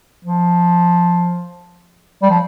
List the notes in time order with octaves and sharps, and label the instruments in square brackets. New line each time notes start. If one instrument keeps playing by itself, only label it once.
[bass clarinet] F3
G3
F3